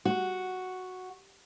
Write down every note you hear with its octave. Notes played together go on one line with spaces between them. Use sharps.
F#4